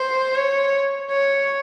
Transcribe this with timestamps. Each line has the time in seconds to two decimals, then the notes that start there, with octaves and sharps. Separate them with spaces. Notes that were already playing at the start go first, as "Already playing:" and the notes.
Already playing: C5
0.35 C#5
1.11 C#5